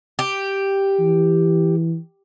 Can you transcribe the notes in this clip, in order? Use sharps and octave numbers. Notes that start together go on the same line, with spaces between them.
G4
E3